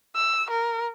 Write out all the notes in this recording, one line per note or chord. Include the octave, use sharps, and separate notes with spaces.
E6
A#4